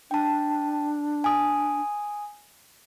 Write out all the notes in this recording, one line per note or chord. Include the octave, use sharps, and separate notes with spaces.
D4 G5 A5
G#5 D#6